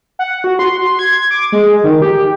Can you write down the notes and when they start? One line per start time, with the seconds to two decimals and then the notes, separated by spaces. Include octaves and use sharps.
0.19 F#5
0.44 F#4
0.59 C6
0.99 G#6
1.31 D6
1.52 G#3
1.84 D#3
2.02 G4